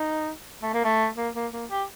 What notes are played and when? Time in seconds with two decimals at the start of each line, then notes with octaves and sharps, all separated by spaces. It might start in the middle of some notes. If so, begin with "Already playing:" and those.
Already playing: D#4
0.63 A3
0.74 A#3
0.85 A3
1.16 A#3
1.34 A#3
1.52 A#3
1.70 G4